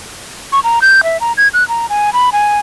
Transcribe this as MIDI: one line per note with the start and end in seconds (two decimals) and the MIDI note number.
0.52 0.60 85
0.64 0.79 82
0.82 1.01 91
1.04 1.20 76
1.21 1.33 82
1.37 1.48 92
1.54 1.67 90
1.68 1.86 82
1.90 2.13 80
2.13 2.30 83
2.32 2.59 80